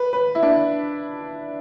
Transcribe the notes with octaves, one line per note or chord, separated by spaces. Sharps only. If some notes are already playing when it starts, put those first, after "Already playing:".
Already playing: B4
B4
E4
D4